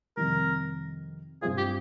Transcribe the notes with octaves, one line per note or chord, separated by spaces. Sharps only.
F2 C3 D#3 G3 A#4
G2 G3 C4 F4 G#4
G4